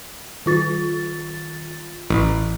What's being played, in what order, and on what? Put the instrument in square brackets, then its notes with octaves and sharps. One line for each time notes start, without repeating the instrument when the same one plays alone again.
[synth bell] D#3 F4 A6
[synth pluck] A1